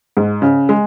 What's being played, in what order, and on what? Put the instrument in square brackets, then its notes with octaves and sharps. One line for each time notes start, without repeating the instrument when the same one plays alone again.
[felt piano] G#2
C#3
G#3